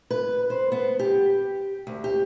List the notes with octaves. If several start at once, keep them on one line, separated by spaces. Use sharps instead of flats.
B4
C5
B3
G4
D2
G4